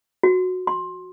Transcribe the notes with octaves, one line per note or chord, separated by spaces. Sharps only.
F#4
C6